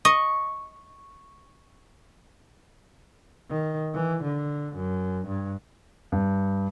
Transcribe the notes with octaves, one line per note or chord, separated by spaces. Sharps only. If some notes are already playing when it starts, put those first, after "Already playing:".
D#5 C#6
D#3
E3
D3
F#2
G2
G2